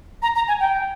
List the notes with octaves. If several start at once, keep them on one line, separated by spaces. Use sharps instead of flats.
A#5
A#5
G#5
G5